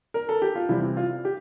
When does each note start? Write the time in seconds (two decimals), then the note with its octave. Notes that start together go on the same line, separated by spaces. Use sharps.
0.14 A#4
0.29 A4
0.42 G4
0.56 F4
0.69 C3 E3 G3 C4 E4
0.97 F4
1.25 G4